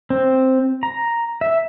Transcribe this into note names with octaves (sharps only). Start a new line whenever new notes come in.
C4
A#5
E5